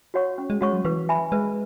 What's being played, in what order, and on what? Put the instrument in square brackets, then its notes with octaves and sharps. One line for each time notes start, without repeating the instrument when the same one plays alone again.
[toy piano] F#4 C#5 F#5 C#6
C#4
[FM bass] G#3
[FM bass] G#3 [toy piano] F#4 C#5 F#5 C#6
[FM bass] F#3
[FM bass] E3 [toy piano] B4
[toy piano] E5 G#5 B5
[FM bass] G#3 [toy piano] B4